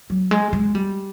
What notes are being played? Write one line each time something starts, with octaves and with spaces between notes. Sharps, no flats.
F#3
G#3
G#3
G3